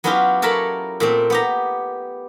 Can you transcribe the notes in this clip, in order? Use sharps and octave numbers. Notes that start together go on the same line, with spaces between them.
F#3 B3 C#4 E4 F4 G4
A4 A#4 C#5 A5 B5
A#2 A3 C4
B3 G4 A#5